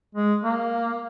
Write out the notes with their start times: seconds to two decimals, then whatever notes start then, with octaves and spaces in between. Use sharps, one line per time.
0.15 G#3
0.44 A#3